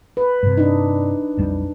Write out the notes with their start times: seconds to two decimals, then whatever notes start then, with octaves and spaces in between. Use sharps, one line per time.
0.17 B4
0.43 G2 C3
0.57 D4 D#4
1.37 B1 F2 G3